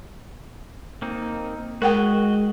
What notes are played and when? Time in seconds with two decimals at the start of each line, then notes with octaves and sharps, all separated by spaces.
1.02 A#3 C4 D#4
1.82 G#3 F#4 A#4 D#5 F#5 G5